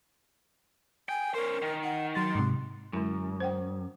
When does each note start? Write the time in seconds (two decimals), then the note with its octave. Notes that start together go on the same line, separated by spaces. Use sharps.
1.09 G5 G#5
1.34 C#4 A#4 C5
1.62 D#3
1.84 F#5
2.15 F#3 C6 A6
2.35 G#2 C3
2.93 F#2 D3 G#3 E4
3.40 C5 F#5 G5